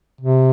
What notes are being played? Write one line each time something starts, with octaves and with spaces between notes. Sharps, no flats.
C3